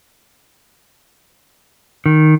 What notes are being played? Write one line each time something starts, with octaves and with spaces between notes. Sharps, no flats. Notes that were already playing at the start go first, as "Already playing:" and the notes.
D#3